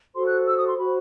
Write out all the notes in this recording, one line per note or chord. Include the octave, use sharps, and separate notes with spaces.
F#4 A4 C5 C6
F#6
E6
D#6
C6
F#4 B5
C5